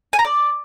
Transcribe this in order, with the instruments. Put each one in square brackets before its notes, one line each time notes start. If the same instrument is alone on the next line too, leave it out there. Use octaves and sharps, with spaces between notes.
[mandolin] G#5
A#5
D5